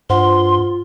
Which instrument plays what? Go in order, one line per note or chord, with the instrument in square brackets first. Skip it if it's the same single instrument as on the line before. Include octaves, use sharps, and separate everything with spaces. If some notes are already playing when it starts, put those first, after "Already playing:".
[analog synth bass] G2 [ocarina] F4 [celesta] C5 F#5 [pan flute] C6